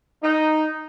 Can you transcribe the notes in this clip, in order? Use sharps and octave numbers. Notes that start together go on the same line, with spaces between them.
D#4